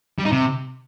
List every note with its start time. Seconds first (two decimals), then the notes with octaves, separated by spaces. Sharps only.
0.19 G3
0.25 D#4
0.32 C3